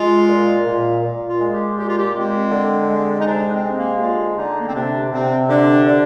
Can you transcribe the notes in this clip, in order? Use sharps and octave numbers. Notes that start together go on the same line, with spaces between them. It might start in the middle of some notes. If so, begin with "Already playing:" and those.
Already playing: G#3 F4
A#2
A#2
A#2
F4
G#3
G4
A#2 G4
F4
G4
G#3 C4
D3
G#3
D#4
C3 D4
C4
G#3
A#3
G4
D3 F4
D3 D#4
A#3
C4
C3 D4
C3 C4
D3 D4
D3